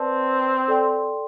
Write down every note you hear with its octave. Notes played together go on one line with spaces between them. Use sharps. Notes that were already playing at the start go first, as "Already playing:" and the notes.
Already playing: C4 B4 D5 A5
A4 D5 G5 C6